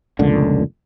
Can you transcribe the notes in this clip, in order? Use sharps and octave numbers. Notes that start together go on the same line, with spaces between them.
F1 C#2 A#2 D3